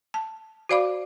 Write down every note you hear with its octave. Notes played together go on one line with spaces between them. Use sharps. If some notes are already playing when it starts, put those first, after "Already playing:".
A5
F#4 C5 D5 F5 B5 D6